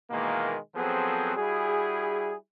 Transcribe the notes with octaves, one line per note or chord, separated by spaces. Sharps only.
B2 D#3 E3 G#3 A#3
F3 F#3 B3 C4 G#4 A4
G3 E4 F#4 G#4